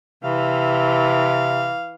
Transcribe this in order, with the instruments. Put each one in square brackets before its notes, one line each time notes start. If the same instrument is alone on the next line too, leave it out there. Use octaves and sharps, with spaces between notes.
[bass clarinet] C3 [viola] E3 [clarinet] F5